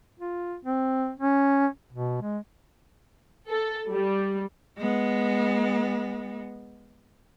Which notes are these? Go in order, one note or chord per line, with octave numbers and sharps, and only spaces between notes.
F4
C4
C#4
B2
G#3
A4
G3
G#3 B3